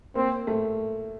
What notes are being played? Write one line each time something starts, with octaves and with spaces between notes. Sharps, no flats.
A#3 C4
A3